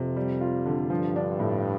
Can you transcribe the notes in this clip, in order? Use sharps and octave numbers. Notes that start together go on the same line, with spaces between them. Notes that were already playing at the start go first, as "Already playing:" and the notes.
Already playing: F2 C3
G3
F4
D3
G2 F3
D4
A2